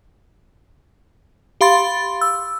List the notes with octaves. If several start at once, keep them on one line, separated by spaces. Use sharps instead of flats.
G4 F5 B5 C6 A6
E6